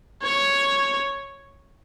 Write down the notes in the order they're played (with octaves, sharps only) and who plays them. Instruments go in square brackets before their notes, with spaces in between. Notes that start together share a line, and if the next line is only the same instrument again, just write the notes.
[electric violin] C#5